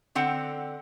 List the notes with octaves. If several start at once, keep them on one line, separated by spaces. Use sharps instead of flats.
D3 C4 F#5 G5